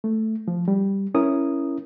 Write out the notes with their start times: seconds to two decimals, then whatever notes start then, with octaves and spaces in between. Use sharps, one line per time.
0.04 A3
0.48 F3
0.68 G3
1.14 C#4 E4 A#4 D#6